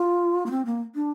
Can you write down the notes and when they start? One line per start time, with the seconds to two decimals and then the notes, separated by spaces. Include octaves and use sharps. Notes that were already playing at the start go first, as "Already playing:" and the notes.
Already playing: F4
0.46 A#3
0.51 C4
0.65 A#3
0.95 D4